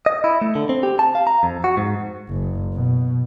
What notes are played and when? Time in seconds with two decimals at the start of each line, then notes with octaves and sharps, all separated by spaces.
0.06 D#5
0.24 E4
0.42 A3
0.55 D3
0.69 C4
0.83 G4
0.99 A5
1.15 F5
1.27 A#5
1.43 F2
1.64 F#4
1.77 G#2
2.29 F#1
2.74 B2